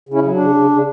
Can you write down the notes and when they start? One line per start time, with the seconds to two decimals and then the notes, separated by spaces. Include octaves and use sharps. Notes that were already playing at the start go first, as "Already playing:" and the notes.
0.09 C#3 C#4 E4
0.24 F#3
0.35 C#3 D4
0.55 C#3
0.71 C#3